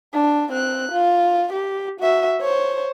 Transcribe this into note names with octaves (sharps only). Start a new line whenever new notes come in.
D4
C4 F#6
F4
G4
F#4 E5
C5 C#5